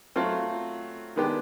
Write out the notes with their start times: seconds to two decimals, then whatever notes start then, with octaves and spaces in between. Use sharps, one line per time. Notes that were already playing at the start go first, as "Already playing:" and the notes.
0.16 F#3 A3 C4 F4
1.16 D#3 G#3 B3 D4 G4